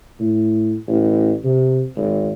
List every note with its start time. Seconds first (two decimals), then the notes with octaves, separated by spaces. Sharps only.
0.19 A2
0.87 A1
1.44 C3
1.95 G#1